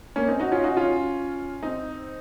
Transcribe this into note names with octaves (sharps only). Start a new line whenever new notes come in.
A#3 C#4
C4 D#4
D#4 F#4
C#4 F4
D#4 F#4
C#4 F4
C4 D#4